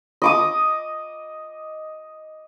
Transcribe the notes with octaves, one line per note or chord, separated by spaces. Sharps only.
D#5 D6 D#6